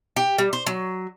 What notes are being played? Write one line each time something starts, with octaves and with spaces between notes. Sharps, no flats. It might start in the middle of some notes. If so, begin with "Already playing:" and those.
G4
G3
C5
F#3